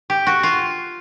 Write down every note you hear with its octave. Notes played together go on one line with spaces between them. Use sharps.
G4
F#4
F4